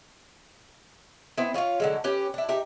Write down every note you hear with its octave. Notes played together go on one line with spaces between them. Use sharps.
B3 C4 E4
C#4 F4 C#5 F5
D3 F#3 G#3
C#4 G4 B4
D4 E4
D#4 G4 E5